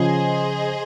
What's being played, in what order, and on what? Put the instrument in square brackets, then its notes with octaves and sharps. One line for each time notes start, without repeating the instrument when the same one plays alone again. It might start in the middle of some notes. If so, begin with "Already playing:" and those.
Already playing: [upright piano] C#3 F3 [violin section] G#4 C5 D#5